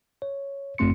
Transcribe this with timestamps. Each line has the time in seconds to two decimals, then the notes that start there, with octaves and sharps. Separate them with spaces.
0.22 C#5
0.78 G1 F#2 A3 C4 C6 C#7